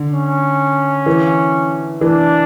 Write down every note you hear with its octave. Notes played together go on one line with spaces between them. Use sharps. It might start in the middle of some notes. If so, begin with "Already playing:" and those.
Already playing: D3
C#4
E3
E3 D4